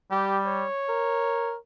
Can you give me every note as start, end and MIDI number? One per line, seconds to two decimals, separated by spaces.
0.11 0.64 55
0.11 0.40 67
0.46 1.57 73
0.89 1.55 70